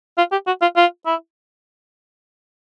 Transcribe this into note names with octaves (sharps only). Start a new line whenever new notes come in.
F4
G4
F#4
F4
F4
E4